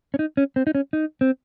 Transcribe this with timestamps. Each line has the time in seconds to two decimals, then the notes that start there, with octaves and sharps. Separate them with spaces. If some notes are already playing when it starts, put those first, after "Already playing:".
0.14 C#4
0.19 D#4
0.37 C#4
0.56 C4
0.67 D#4
0.75 C#4
0.93 D#4
1.21 C4